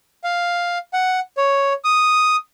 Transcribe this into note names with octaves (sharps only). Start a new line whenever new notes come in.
F5
F#5
C#5
D#6